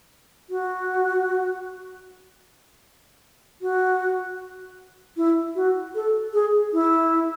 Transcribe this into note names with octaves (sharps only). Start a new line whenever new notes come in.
F#4
F#4
E4
F#4
A4
G#4
E4